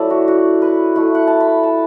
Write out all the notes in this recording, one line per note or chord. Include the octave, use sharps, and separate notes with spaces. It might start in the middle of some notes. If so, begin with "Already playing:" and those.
Already playing: F#3 A3 E4 D5 E5
F#4
F#4
B4
A3 E4
F#5
A5
B5
A5